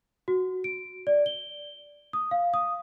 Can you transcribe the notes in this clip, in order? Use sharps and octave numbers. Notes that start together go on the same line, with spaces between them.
F#4
D7
D5
G7
D#6
F5
D#6